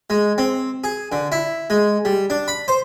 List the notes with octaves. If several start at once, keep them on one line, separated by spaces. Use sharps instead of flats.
G#3
C4
G#4
D3
E4
G#3
G3
D4
B5
C5